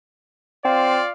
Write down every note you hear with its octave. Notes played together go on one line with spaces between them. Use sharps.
C4 F4 D5 F5